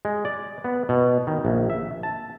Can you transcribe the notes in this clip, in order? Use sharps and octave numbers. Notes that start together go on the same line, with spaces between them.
G#3
D5
B3
B2
D#3
A#1
E5
A5